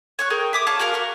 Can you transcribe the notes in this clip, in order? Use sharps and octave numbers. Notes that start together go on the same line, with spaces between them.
C#5 C#6 F#6
G#4 A#4 G5
E5 D6 D#6
F4 C#5 A5 D6
F#4 G#4 A#4 F5
F#4 A#4